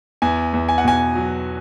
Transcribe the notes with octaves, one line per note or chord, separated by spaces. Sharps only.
E2 G#5
E2
G#5
F#5
B2 G#5
F#3